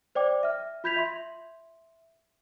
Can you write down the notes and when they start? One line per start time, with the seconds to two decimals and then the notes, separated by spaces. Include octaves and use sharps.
0.15 C5 D5 G5 D6
0.43 E5 F6
0.84 F4 B5 G6 G#6 B6 F7
0.96 E5 C6